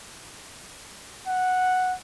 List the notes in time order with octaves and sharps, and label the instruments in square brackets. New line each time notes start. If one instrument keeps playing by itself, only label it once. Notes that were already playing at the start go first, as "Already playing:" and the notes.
[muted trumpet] F#5